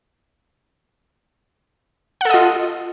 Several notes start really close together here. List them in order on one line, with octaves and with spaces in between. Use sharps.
F#5 A4 D#5 F4